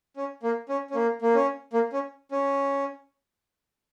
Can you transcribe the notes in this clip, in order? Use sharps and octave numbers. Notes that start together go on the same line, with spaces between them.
C#4
A#3
C#4
C#4
A#3
A#3
C#4
A#3
C#4
C#4